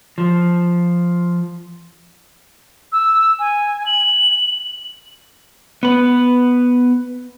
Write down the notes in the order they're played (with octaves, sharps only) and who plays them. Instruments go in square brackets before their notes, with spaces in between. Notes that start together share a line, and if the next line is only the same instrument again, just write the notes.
[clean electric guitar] F3
[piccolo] E6
G#5
F#7
[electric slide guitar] B3 B4